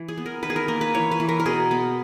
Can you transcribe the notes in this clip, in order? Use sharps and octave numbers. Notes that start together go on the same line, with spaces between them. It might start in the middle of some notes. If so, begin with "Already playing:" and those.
Already playing: E3
G#4
B3
A#4
D#3 B4
G#4
A#4
A#3 A#4
B4
E3 C#5
B4
E3
A#4
A#4
B2 G#4
B3